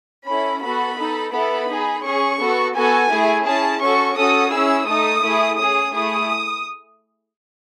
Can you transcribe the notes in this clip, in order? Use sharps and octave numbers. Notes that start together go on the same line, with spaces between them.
C#4 E4 A4 B5
B3 F#4 A4 B5
D#4 A4
B3 E4 A4 B5
D#4 G#4
C#4 G#4 C#6
B3 F#4 A4
B3 F#4 A4 G#5
A3 E4 G#4
C#4 E4 G#4 A5
C#4 F#4 A4 C#6
C#4 F#4 A4 D#6
C#4 E4 G#4 E6
A3 D#4 A4 D#6
A3 E4 G#4
C#4 G#4 D#6
A3 E4 G#4 D#6